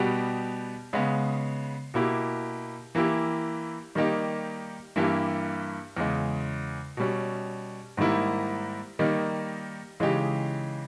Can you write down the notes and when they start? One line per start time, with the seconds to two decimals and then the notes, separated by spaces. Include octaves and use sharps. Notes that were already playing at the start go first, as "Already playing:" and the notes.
Already playing: B2 G3 B3 G4
0.93 C#3 G#3 B3
1.94 B2 A#3 E4 G4
2.95 E3 A#3 E4 G4
3.95 D#3 G3 A#3 D#4 G4
4.96 G2 E3 A#3 E4 G4
5.97 E2 C#3 G#3
6.97 B2 G3 C#4
7.97 G#2 D#3 G3 A#3 E4
8.99 D#3 G3 A#3 D#4
10.00 C#3 E3 G#3 D#4 G4